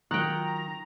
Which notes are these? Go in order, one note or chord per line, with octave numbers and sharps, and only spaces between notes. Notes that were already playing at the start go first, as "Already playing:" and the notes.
D#3 F#3 F4 F#5 G5 A#5